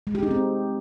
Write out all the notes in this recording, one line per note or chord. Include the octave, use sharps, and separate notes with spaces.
G#3
G4
D#4
C4